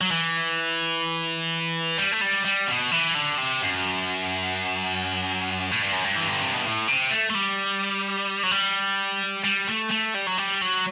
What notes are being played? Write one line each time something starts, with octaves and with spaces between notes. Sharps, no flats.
F#3
E3
G3
A3
G3
G3
B2
E3
D3
C3
F#2
A2
G2
F#2
G2
E3
D3
C3
B2
A2
C3
A3
A3
G3
F#3
G3
G3
A3
A3
G3
F#3
G3
F#3